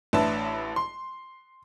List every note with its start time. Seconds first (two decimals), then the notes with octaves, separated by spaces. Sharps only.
0.13 A1 D4 B4 E5 A5
0.76 C6